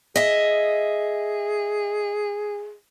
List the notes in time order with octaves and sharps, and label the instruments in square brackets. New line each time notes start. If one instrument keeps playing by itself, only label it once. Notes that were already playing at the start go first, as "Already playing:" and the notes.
[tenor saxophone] G#4 [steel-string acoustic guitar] D#5 E5